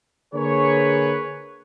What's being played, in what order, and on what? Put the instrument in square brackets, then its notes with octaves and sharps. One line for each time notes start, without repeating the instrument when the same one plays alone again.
[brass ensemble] D3 A#3 G#4 B4 C#5